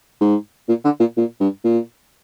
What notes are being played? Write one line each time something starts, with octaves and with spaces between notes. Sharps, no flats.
G#2
A#2
D3
A#2
A#2
G2
A#2